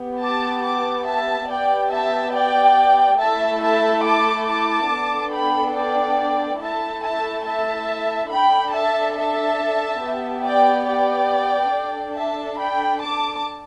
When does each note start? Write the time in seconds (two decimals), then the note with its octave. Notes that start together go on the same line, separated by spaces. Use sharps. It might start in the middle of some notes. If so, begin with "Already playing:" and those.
Already playing: B3 G4
0.21 A5 D6
0.64 A5 D6
1.06 E5 A5
1.49 B3 G4 D5 G5
1.92 E5 A5
2.34 D5 G5
3.19 A3 E4 A4 E5 A5
3.62 E5 A5
4.05 A5 D6
4.48 A5 D6
4.90 B3 D4 A4
5.33 G5 B5
5.75 D5 G5
6.61 A3 E4 A4 E5 A5
7.03 E5 A5
7.46 E5 A5
8.31 D4 A4 G5 B5
8.74 E5 A5
9.17 E5 A5
10.02 B3 G4
10.45 D5 G5
10.88 D5 G5
11.73 D4 A4
12.15 E5 A5
12.58 G5 B5
13.00 A5 D6